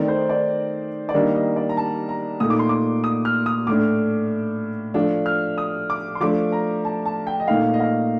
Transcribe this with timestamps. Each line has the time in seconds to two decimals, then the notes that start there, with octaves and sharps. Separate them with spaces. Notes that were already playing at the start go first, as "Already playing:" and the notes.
Already playing: D#3 A3 C4 D#4 D5
0.08 C5
0.29 D5
1.09 D5
1.13 D#3 G3 A#3 D4 D#5
1.35 D#5
1.56 D5
1.69 A#5
1.77 A5
2.09 A#5
2.40 A#2 A3 D#4 D#6
2.50 D6
2.59 C6
2.69 D6
3.04 D#6
3.25 F6
3.46 D#6
3.67 A2 A3 D4 D6
4.94 F3 A3 D4
5.26 F6
5.58 D#6
5.90 D6
6.15 C6
6.21 F3 A3 D4 D6
6.52 A#5
6.85 A5
7.05 A5
7.27 G5
7.40 D#5
7.48 A#2 A3 D#4 F5
7.74 D#5
7.80 F5